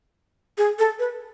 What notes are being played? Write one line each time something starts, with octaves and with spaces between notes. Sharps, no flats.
G#4
A4
B4